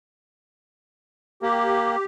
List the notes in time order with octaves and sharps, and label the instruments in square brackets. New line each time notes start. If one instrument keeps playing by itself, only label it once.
[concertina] A#3 [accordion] G4